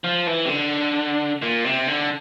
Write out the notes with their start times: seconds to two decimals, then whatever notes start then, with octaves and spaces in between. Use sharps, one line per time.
0.04 F3
0.27 E3
0.45 C3
0.49 D3
1.42 A#2
1.65 C3
1.88 D3